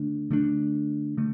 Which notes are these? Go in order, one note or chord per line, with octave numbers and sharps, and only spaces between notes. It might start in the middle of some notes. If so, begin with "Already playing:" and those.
Already playing: D3 A3 D4
D3 A3 D4
D3 A3